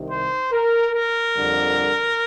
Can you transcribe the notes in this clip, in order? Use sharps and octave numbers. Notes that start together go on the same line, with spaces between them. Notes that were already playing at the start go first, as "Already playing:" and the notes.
Already playing: C2 C3 D#3
C5
A#4
A#4
F2 D3 G3 D4